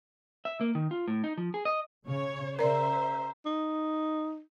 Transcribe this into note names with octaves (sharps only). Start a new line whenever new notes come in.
E5
A#3
D#3
F4
A2
D#4
F3
G#4
D#5
C#3 C#5
C#3 A#4 C5 D5 E5 A#5
D#4